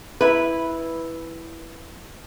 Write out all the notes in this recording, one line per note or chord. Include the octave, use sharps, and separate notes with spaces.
E4 B4